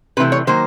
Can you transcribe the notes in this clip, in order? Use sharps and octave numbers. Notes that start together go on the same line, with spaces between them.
C3 E3 A3 B4
C#5
D#3 F#3 A#3 C5